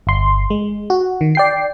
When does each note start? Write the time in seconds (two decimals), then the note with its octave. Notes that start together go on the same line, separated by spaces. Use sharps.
0.07 G1 C6
0.50 G#3
0.90 F#4
1.21 D#3
1.35 D5 G5 C7